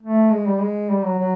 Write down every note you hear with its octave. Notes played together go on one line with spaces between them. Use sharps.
A3
G#3
G3
G#3
G3
F#3
F#3